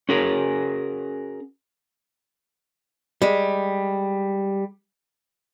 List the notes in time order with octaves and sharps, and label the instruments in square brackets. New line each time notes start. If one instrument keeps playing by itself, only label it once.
[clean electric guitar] C#4 F#4 G#4 A#4
[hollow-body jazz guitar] G3 G#3